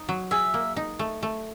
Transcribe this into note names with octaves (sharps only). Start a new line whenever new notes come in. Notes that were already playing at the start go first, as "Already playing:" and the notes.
Already playing: D#4
F#3
G#4 E5
A#3
D#4
A3
A3